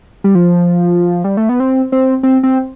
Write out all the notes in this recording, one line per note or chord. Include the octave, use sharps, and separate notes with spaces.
G3
F3
G3
A3
B3
C4
C4
C4
C4